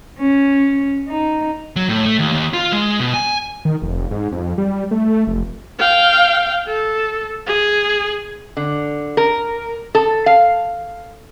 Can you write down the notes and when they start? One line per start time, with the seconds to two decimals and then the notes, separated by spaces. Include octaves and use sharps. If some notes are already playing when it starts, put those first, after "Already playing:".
0.19 C#4
1.08 D#4
1.76 F#3
1.89 A2
2.05 A3
2.19 D#2
2.32 D#2
2.53 F4
2.72 G#3
3.00 B2
3.14 G#5
3.65 D#3
3.82 F1
4.11 G#2
4.32 F2
4.58 G3
4.91 A3
5.27 F1
5.79 F5 G5
6.67 A4
7.47 G#4
8.57 D3
9.17 A#4
9.95 A4
10.26 F5